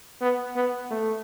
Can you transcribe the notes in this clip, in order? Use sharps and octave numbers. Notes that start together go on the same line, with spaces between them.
B3
B3
A3